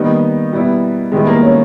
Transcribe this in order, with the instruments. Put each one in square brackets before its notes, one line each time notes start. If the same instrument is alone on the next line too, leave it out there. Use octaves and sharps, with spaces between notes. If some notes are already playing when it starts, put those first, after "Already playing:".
Already playing: [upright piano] D#3 G3 B3 D#4 [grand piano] A#3
[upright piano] B2 G3 B3 E4
[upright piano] D#3 G3 B3 E4 [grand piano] G#3
[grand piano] A#3
C#4